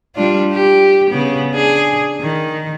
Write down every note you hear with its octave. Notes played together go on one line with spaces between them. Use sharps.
G3 D4 F4
G4
C#3 B3
D4 G#4
D#3